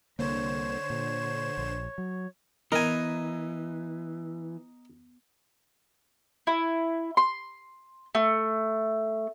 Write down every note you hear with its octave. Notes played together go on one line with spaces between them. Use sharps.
C2 D3 A#3 C5 C#5 E7
A#2
A#1
F#3
E3 B3 D#4 A#4 G#5
E4
C6
A3